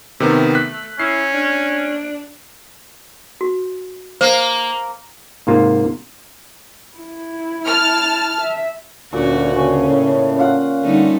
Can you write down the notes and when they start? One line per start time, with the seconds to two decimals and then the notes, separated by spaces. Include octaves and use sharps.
0.20 C3 D#3 A3 B3
0.55 F#6 B6
0.99 C#4 E4 C7
1.34 D4
3.41 F#4
4.21 A#3 C5
5.47 G#2 C3 A#3 F4
6.98 E4
7.67 A5 F6
8.41 E5
9.13 D2 A#2 C#4 F#4
9.56 C#3 C#4
9.90 A2
10.39 F4 F5 F#5
10.83 D3 G3 A3 D#4